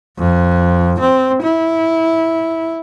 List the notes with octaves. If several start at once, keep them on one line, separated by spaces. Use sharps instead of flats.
F2
C4
E4